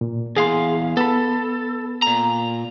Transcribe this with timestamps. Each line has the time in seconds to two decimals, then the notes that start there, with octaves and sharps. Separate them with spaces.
0.01 A#2
0.37 E2 G#4 F5 C6
0.97 B3 A4 B5
2.02 A#2 A#5